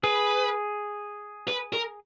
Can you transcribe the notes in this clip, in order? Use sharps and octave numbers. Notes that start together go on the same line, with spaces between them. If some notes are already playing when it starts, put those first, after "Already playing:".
G#4 B4
B4
A#4